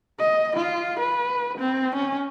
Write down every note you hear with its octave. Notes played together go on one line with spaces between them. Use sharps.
D#5
F4
B4
C4
C#4